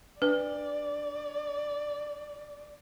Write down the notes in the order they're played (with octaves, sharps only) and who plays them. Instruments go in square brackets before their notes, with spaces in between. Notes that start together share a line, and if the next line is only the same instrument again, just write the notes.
[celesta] D4 [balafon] B4 [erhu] D5